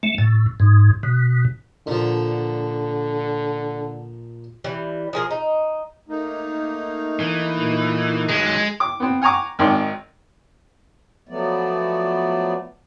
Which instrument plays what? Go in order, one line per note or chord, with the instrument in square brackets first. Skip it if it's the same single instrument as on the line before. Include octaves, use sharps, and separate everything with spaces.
[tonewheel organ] A3
A2
G#2
B2
[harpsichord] A#2 F3 [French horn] D3
[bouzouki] E3 G3
F3 G#4 A#4
D#4
[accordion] A3 A#3 D#4
[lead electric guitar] E3
[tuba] A#2
[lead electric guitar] D#3 F#3 [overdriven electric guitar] G#3
[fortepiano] D6
B3 C4
F#5 G#5 A#5 C#6 D6
G#1 D#3 C4 D5 C6
[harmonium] F3 F#3 A3 B3 D5